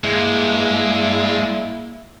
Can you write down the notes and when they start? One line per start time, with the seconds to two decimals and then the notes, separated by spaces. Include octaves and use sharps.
0.04 G2 G#3 A#3 E4